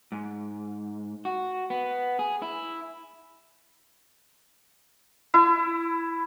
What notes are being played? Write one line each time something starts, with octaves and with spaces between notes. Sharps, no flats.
G#2
F#4
B3
G#4
E4
E4